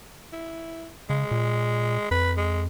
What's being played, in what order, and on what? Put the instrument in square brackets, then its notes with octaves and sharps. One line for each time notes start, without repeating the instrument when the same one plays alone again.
[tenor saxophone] E4
[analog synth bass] C#3 [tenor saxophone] G#3
[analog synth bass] A#2
[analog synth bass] F2 [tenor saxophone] B4
[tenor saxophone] G#3